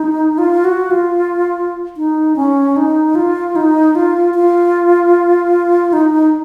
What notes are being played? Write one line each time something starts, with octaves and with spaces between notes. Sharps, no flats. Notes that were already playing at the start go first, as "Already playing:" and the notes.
Already playing: D#4
F4
F#4
F4
D#4
C#4
D#4
F4
D#4
F4
F4
D#4